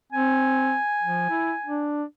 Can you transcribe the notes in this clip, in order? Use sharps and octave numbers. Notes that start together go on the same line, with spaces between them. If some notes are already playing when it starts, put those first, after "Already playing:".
C4 G#5
F3
E4
D4